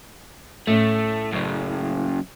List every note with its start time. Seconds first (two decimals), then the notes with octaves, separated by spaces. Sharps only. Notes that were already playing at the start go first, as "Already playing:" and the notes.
0.67 A2 A3 C#4
1.33 F#2 C#3